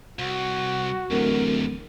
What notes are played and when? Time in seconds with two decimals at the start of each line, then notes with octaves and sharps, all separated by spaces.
0.19 C2 F#4
1.11 D1 E2 G#2 A#4